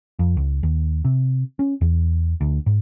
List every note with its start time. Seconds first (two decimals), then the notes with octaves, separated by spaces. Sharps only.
0.19 F2
0.37 C#2
0.63 D#2
1.05 C3
1.59 C#4
1.81 E2
2.41 D2
2.66 G#2